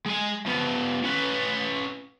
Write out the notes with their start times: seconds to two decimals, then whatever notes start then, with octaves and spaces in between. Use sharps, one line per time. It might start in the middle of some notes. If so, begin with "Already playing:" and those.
0.06 G#3 G#5
0.46 F3 B3
1.04 C#4 B4